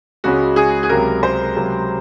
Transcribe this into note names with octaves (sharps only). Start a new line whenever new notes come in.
C#2 C#3 G#3 C#4 F#4
G#4
G#4
C#2 C3 F#3 C4 A#4
C5
C#2 C3 F#3